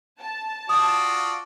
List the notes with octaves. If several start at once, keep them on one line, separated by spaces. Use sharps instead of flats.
A5
F4 F#4 D5 D#6